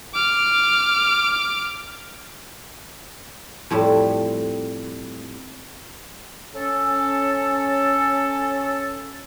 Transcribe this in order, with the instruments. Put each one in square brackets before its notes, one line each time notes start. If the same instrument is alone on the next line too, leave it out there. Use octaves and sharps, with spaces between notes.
[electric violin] D6 F6
[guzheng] F2 A2 G3 A5
[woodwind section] C#4 A4